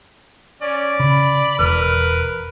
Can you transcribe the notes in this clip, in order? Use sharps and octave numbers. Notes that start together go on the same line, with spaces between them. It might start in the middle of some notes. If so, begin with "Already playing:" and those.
C#4 D5
C#3 B5
E1 A#4 B4